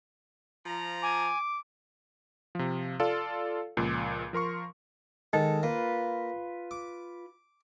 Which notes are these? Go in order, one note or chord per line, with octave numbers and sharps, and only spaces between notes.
F3 A#5
G#5 D6
C3 F3
F4 A4 D5 F5
C#2 A#2 F3
F3 A#4 C6 C#6
D#3 G#3 A4
A#3 F4 B4
D6